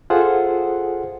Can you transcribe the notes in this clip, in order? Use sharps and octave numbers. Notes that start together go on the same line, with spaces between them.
F4 G#4 A4 C5 F#5